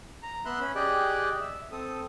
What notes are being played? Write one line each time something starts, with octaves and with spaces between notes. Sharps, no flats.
A#5
B3 E5 B5 C6 F#6
C#4 B5
G4 G#4 D5 D#5 G5 F#6
E5
C4 A4 D#6